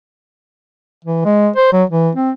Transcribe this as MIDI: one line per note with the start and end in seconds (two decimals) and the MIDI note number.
1.05 1.22 52
1.25 1.49 56
1.56 1.69 72
1.73 1.83 54
1.90 2.10 52
2.15 2.31 60